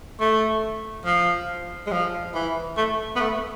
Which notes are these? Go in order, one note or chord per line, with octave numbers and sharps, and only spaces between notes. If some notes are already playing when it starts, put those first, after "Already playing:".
A3
F3
G#3
F3
E3
A3
B3
A3